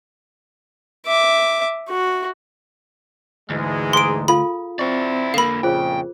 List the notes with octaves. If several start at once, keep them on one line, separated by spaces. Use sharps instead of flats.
E5 D6
F#4
D2 G#2 E3 G#3
G#4 A#5 C6 D#6 D7
F4 A4 F5 B5
C4 E4 D5 C#6
D3 A#3 A4 A#4 F5 B5
F2 A#2 C#3 F4 G#4 C5 G5